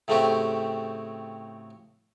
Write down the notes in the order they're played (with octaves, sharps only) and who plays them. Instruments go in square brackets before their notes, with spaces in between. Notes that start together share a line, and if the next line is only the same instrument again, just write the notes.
[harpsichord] A2 C#3 A3 C4 F#4 G4